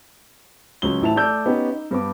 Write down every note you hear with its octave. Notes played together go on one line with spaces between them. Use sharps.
C#2 F#3 C#4 G7
A1 E4 A5 F7
A3 D5 A5 D6 E6 G6
B3 C#4 D#4 G4
D#4
G2 B3 D6